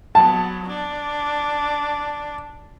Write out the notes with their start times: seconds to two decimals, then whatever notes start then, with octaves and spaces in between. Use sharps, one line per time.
0.15 F#3 B3 A5
0.68 D4